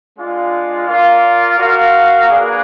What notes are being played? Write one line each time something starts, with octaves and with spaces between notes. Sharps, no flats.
G#3 D4 F4
F4 A#4 D5 F5
F#4 A#4 F5
A#3 D4 G#4 B4